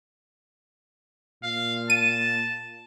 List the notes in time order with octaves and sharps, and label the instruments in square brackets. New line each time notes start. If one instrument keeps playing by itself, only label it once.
[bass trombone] A#2 [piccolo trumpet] F5
[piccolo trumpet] A5 [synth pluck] D#7